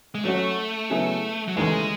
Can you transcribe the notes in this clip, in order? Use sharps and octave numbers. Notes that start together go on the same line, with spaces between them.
G#3
F#3 A3 C#4 F#4
C#3 F#3 B3 E4 G#4
F#3
D#2 C#3 E3 G#3 A3 D#4